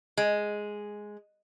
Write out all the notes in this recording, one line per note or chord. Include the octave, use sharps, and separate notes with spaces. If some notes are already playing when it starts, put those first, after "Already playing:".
G#3